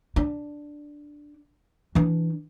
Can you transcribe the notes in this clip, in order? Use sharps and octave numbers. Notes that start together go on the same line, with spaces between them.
D4
E3 D4